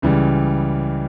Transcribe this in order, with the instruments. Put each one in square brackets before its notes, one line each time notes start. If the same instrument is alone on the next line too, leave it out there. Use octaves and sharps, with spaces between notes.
[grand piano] C#2 C#3 E3 G3